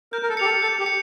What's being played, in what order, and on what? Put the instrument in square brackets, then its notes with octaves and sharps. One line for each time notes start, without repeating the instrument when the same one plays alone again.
[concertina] A#4 [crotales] G6
[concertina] A#4
A4
[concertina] G4 [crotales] C#7 F7
[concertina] A4
[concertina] A4 [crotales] G6
[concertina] G4
[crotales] C#7